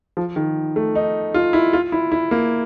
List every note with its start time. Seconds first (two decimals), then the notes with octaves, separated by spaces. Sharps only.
0.17 F3
0.36 D#3
0.76 A3
0.95 D#4
1.34 F4
1.53 E4
1.73 F4
1.92 E4
2.12 E4
2.31 A#3